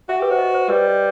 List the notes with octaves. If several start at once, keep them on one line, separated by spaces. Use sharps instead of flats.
F#4 E5
G4 B4
F#4 C5
D#5
C5
G3 B4
D#5